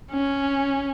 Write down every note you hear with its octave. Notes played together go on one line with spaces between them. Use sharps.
C#4